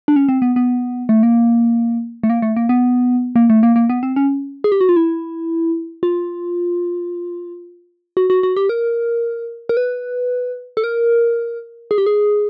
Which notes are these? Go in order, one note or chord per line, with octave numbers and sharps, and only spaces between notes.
D4
C#4
C4
B3
B3
A3
A#3
A3
A#3
A3
A#3
B3
A#3
A3
A#3
A#3
B3
C4
C#4
G#4
G4
F#4
F4
E4
F4
F#4
F#4
F#4
G4
A#4
A#4
B4
A4
A#4
G#4
G4
G#4